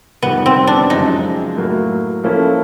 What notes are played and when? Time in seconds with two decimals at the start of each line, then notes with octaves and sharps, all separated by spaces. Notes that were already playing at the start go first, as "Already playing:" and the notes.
0.22 F2 C3 D#3 G3 B3
0.46 C4
0.67 D4
0.90 F#2 C#3 F3 G#3 D#4
1.57 A2 F#3 A#3
2.23 F3 A#3 C#4 E4 A4